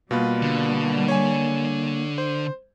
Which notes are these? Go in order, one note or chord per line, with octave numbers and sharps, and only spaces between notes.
B2 G3 A#3 F4 B4
D3
C#5 G#5
C5